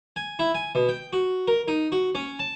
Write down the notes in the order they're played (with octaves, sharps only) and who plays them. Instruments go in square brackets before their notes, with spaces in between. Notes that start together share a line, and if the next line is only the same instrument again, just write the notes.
[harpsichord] G#5
E4
G#5
B2
G5
F#4
A#4
D#4
F#4
C#4
A5